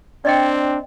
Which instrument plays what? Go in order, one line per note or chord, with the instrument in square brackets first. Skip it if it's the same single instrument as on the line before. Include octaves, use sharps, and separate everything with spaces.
[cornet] C4 [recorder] D4 [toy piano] D5 D#5 G5